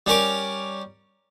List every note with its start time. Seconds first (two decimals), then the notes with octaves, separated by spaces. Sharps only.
0.06 G3 C#4 A#4 D6